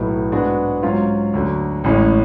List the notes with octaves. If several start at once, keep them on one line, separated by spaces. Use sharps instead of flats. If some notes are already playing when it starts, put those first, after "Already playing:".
Already playing: B1 A2 F#3 B3
G#2 G#3 B3 D4 F#4
G#2 F#3 C#4 F4
D2 D3 F#3
A1 A2 G#3 C#4